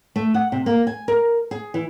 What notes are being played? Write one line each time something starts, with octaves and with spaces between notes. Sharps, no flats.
A3
F#5
C3
A#3
G#5
A#4
G#4
E3